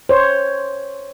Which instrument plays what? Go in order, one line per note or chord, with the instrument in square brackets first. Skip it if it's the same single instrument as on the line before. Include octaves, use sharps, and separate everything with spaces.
[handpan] C5 C#5